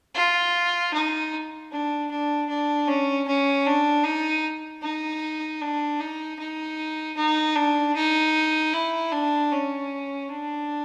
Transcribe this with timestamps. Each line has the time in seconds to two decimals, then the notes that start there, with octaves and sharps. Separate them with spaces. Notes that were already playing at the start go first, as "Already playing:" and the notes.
0.15 F4
0.93 D#4
1.71 D4
2.10 D4
2.49 D4
2.88 C#4
3.27 C#4
3.66 D4
4.05 D#4
4.82 D#4
5.61 D4
6.00 D#4
6.39 D#4
7.17 D#4
7.56 D4
7.95 D#4
8.73 E4
9.11 D4
9.51 C#4
10.29 D4